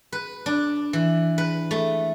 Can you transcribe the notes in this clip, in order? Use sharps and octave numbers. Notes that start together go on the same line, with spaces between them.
B4
D4
E3
B4
A3